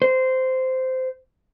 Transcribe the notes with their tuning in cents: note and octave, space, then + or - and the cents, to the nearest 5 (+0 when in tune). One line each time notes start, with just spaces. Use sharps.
C5 -15